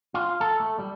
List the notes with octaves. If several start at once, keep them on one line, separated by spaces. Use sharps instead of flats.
F4
A4
A3
G3